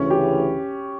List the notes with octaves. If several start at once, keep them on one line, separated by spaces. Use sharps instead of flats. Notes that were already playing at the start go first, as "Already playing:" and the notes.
Already playing: D2 C#3 E3 C#4
G4